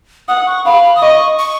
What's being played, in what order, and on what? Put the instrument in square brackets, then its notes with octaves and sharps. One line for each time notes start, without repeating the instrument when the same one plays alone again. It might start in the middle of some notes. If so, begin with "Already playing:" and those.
[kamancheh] F#5 [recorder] D#6
[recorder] C#6
[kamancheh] F5 [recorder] B5
[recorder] B5
D#6
[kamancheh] D#5 [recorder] C#6
[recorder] C#6